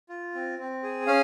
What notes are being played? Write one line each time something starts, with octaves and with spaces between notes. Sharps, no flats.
F4
C4
C4
G#4
C#4 F5